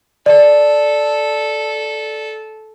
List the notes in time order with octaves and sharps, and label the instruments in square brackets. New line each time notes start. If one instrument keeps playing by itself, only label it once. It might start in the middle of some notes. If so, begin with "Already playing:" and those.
[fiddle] A4 [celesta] D5